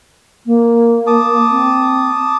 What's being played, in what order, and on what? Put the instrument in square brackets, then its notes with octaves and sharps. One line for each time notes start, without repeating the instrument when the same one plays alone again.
[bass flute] A#3
[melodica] A5 D6 D#6
[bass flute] C4